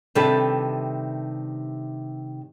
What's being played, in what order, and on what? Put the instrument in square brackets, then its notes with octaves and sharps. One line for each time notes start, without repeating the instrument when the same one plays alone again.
[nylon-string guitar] C3 D#3 G3 D4 A4 B4